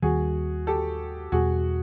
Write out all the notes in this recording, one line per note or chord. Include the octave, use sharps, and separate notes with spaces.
D#2 D#3 G3 F#4 G#4
G4 A4
E2 B2 G3 F#4 G#4